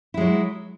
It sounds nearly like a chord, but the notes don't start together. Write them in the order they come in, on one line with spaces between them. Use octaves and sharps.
E4 G#3 F#3